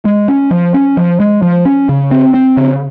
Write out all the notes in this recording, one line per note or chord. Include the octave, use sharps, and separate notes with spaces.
G#3
C#4
F3
C#4
F3
G#3
F3
C#4
C#3
C4
C4
C#3